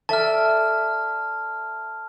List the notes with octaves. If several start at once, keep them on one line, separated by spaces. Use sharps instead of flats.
A4 D5 E5 A5 F6